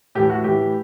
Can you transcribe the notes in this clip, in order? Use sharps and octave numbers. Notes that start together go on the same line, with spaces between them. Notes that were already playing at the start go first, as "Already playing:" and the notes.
A2 E3 G4
F#4
A2 E3 G4